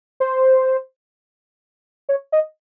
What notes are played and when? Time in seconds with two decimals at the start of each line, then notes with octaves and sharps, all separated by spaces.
0.20 C5
2.09 C#5
2.32 D#5